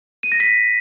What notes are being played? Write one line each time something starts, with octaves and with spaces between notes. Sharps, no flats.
D#7
A#6
B6